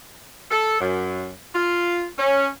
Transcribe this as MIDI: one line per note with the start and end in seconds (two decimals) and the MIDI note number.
0.51 0.81 69
0.81 1.30 42
1.55 2.05 65
2.19 2.47 61